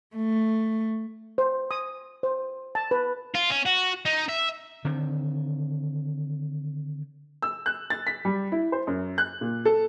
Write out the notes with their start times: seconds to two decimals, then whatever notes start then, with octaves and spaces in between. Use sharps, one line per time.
0.16 A3
1.38 C5
1.71 D#6
2.23 C5
2.75 A5
2.91 B4
3.34 F4
3.50 C#4
3.66 F#4
4.05 D#4
4.29 E5
4.85 D3 D#3 C4
7.42 E6
7.66 F#6
7.90 A6
8.07 B6
8.25 G3
8.52 E4
8.72 C5
8.87 F#2
9.18 F#6
9.41 A#2
9.65 A4